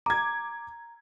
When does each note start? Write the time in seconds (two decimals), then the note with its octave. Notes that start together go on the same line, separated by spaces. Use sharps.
0.06 A#5 D6 G#6